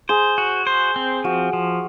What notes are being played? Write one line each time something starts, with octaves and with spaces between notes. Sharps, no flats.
G#4 C5
F#4
C5
C4
F3 F#4
F3